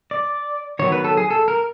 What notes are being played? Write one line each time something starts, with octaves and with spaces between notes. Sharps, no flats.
D5
D#3 F#3 B3 C#5
B4
A4
G#4
A4
A#4